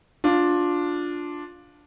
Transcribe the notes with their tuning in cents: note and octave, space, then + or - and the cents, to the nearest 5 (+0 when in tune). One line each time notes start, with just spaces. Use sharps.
D4 +0 F4 +15